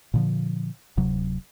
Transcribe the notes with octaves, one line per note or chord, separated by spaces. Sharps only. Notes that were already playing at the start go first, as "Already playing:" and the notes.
A#2 D3 F3
D1 C3 F#3